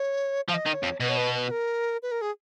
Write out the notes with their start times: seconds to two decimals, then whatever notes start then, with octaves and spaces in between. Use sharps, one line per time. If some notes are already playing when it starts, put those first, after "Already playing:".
Already playing: C#5
0.48 F3 F5
0.54 D#5
0.66 D#3
0.74 C#5
0.83 F2
1.00 B2 B4
1.09 C#5
1.17 B4
1.34 B4
1.51 A#4
2.03 B4
2.11 A#4
2.22 G#4